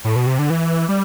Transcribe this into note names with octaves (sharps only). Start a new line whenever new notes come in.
A2
B2
C3
D3
E3
G3